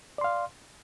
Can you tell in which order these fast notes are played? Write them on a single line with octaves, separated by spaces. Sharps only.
D5 C6 F5